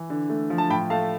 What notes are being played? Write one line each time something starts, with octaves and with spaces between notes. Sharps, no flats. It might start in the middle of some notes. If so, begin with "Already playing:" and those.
Already playing: E3
D3
A3
F3
A5
A2 G5 B5
A3 F5 A5